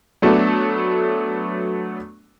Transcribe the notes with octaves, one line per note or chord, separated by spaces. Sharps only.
F#3 A3 B3 D4 A4